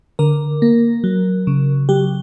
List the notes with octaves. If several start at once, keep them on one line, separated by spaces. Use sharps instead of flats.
D3 A#4
A#3
F#3
C#3
F#3 G4